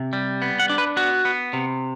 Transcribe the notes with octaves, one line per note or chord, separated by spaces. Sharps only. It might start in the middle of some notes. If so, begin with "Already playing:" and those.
Already playing: C3
G3
B3
F#5
D4
B4
B3 F#4
B3
C3